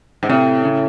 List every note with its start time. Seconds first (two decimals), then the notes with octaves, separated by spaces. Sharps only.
0.23 G#2
0.29 A2 C3
0.65 C#3